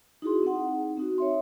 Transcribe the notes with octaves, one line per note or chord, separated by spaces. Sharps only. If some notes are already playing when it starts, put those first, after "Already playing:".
D#4 E4 F#4 G#4 C6
C4 D#4 F#5
C4 D#4 F#4
C#5 E5 C6